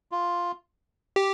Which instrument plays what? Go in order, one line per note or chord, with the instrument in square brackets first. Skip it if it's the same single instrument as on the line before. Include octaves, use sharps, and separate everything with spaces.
[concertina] F4
[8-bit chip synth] G4